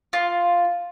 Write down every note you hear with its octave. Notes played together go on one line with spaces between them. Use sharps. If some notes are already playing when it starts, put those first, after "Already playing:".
F4